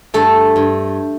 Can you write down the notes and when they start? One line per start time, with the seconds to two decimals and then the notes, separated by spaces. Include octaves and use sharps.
0.14 G2 A3 A4
0.56 G2